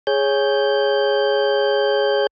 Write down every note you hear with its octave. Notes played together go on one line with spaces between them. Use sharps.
G#4 C#5 G6